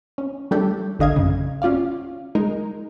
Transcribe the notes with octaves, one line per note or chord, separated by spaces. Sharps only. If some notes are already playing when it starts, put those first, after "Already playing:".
C#4
G3 A3 D4 G4 A4
A1 D3 D#5 F5 G#6
F#2 C#3
C#4 F4 D5 F5
G#3 D#4 A#4